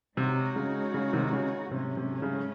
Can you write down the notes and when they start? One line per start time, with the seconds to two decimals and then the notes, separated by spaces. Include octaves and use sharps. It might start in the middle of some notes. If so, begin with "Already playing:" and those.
0.17 C3 G#3 D#4 F#4 C#5
0.56 C#3
0.94 C#3
1.13 C3 D#3
1.33 C#3
1.71 G#2 C3 F#3 A3 C#4
1.97 C3
2.22 C#3